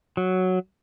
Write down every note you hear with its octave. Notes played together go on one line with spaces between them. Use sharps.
F#3